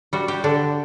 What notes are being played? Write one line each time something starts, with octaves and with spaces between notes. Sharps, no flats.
G3 F#4
G4
D3 D4